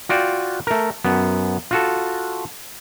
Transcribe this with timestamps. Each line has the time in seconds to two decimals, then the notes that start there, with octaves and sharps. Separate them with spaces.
0.09 F4 F#4 D5 G5
0.67 A3 A#4
1.04 F#2 B3
1.71 F4 F#4 A4